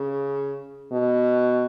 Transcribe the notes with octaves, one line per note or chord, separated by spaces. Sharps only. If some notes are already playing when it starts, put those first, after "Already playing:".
Already playing: C#3
B2